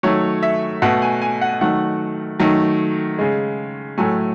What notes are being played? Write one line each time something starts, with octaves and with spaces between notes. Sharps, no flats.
D#3 F#3 A3 C#5
E5
B2 A3 F#5
G#5
G#5
F#5
D#3 F#3 A3 F#5
D#3 F#3 A3
C#3 G#3
A2 F#3 A3 G#5